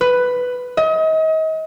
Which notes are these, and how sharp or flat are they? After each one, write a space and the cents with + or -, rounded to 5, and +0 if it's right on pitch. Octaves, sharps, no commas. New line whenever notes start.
B4 +5
D#5 +35